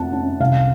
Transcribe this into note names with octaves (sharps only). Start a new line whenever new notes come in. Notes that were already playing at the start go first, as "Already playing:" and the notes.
Already playing: F2 F#5 A5
C#4
C2 F5